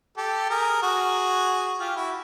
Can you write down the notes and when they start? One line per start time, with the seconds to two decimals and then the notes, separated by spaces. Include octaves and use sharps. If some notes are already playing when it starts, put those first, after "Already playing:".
0.17 G4 A4
0.50 G#4 A#4
0.82 F#4 G#4
1.80 F4 G4
1.96 E4 F#4